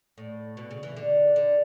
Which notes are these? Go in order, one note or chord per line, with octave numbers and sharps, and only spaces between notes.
A2
B2
C#3
E3
D3
D3